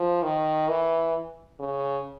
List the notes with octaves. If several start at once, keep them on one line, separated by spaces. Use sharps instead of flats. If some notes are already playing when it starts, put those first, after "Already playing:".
Already playing: F3
D#3
E3
C#3